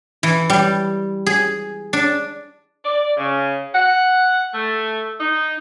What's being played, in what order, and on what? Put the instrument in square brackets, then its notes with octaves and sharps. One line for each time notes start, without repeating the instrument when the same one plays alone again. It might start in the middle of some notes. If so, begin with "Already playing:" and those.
[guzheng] E3
G3
G#4
D4
[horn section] D5
C#3
F#5
A3
D#4